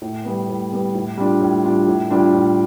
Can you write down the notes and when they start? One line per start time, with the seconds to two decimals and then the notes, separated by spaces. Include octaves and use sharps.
0.02 A2
0.25 G3 B3
0.49 A2
0.72 G3 B3
0.95 A2
1.17 G3 D4 F4
1.41 A2
1.64 G3 D4 F4
1.88 A2
2.10 G3 D4 F4
2.34 A2